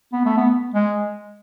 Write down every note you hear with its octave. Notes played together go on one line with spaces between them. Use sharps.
B3
A3
B3
G#3